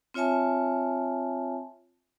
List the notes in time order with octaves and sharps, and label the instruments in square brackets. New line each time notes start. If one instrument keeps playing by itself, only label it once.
[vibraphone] C4 F4 C#5 E5 G#5 A5